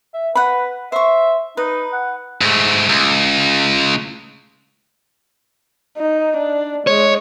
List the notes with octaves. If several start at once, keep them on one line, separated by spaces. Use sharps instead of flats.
E5
B4 F#5 B5
C5 E5 C#6
D#4 B4
F#5
G#2 A3
C#2
D#4
D4
G#3 C#5